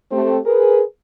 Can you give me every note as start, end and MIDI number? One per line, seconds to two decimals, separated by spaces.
0.12 0.38 57
0.12 0.38 60
0.12 0.38 67
0.45 0.82 68
0.45 0.82 70
0.45 0.82 71